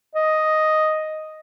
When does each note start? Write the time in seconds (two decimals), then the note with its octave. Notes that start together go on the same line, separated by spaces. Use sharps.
0.15 D#5